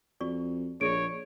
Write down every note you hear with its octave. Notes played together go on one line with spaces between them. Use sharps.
F2 F#4 D5 C#6
A#1 G#4 C#5 D5 E5 D7